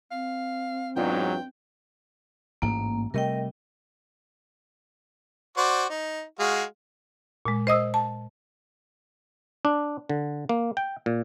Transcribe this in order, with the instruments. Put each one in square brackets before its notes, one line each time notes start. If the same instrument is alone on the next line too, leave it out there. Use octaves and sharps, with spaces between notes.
[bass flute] C4 [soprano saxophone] F5
[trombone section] E2 G#2 F#3 [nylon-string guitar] B3 D4 F4 [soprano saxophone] G5
[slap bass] A1 G#2 [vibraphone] A#3
[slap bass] C3 G3 A3 [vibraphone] A#4 D#5 G5
[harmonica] F#4 C5 D5
D#4
G#3 F#4 F5
[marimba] A#2 G#3
C5 D#5 D#6 E6
A5
[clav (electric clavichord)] D4
D3
A#3
G5
A#2